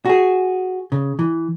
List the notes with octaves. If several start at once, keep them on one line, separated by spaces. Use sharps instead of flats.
F#4 G#4
C#3
E3